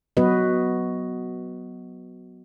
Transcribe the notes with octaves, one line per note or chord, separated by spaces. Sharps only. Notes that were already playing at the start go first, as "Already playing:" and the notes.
F#3 B3 F#4 B4 D#5